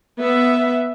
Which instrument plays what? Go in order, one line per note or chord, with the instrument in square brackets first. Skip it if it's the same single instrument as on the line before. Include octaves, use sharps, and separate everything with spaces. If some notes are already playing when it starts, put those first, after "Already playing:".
[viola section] B3 E5